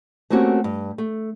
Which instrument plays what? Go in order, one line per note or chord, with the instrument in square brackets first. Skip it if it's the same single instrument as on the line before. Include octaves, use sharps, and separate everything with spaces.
[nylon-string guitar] A3 A#3 C4 C#4 F#4 G4
G2
A3